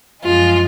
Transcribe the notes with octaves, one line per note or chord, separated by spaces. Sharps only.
F#2 F3 G#3 F4